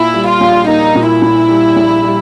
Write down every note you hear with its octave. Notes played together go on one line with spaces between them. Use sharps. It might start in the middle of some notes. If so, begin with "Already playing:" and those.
Already playing: A#2 E4
G3
F4
A#1
A#3 D#4
A#2
E4
A#2
G3
A#1
G3